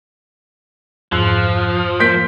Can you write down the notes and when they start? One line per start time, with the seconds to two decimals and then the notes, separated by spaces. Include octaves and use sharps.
1.12 F2 G#2 F3 E6 F#6 C7
2.00 A#3 G6 B6 D7